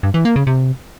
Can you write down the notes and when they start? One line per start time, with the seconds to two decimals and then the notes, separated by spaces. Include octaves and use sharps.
0.03 G2
0.14 E3
0.25 A#3
0.36 C#3
0.47 C3